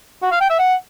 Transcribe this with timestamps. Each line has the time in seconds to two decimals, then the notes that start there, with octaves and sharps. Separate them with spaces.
0.22 F#4
0.32 F5
0.41 G5
0.50 E5
0.59 F#5